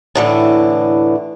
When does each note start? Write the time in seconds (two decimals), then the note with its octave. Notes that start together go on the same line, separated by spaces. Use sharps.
0.15 A2 D3 E3